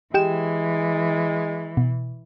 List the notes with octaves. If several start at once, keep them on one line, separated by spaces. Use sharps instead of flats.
E3 G#3 G4 G5 E7
B2